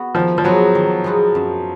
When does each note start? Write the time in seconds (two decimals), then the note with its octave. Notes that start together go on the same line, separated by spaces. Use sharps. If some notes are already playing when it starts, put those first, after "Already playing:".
Already playing: B3 F#4
0.15 D#3 F3
0.38 F3
0.44 F#3 G#3 B3 D#4 F#4
0.75 D#3
1.04 G#3 B3 D#4 F#4
1.35 F#2